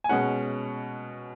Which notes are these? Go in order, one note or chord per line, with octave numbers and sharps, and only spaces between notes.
G#5
B2 G#3 C#4 F#5